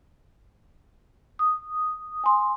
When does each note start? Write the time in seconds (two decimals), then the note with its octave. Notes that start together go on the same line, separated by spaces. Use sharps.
1.39 D#6
2.24 G#5 C6